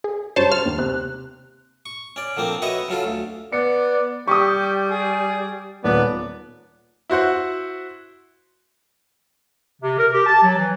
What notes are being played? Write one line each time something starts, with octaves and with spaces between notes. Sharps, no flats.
G#4
F#2 G3 C5 C#5 A5
C5 F6
D#2
C3 C4 F#6
C#6
C#4 D5
D3 F3 A#3 C4
F#4 B4 C#5 D#5 E5
C#3 F#3 F4 A4
D2
B3 D5 C#7
G3 G4 C#6 D#6
G#4
D#1 B3 D5
E4 F#4 C5 F#5
C3
A#4
G4
A5
F#3
E3